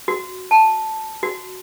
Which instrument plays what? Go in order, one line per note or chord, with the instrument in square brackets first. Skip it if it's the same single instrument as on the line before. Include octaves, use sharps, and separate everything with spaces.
[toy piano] F#4
A5
F#4